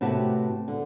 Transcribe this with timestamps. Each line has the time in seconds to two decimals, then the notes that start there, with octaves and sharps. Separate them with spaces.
0.01 A2 C3 F#4 G4 B4 A5
0.68 D3